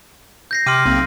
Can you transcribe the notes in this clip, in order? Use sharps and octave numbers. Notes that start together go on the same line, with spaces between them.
G6 A#6 C7
C3 G5 C6 D6 F6 D#7
B1 A#3 C4